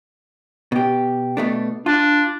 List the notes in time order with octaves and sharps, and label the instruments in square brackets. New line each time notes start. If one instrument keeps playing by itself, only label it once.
[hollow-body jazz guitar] B2 G4
B2 A3 D4
[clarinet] D4 [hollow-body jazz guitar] F4